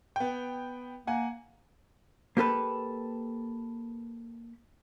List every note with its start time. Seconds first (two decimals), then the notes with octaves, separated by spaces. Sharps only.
0.16 B3 G5
1.07 A#3 F#5 G#5
2.37 A#3 G4 A4 B4